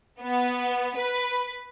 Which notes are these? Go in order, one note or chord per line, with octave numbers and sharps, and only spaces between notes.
B3
B4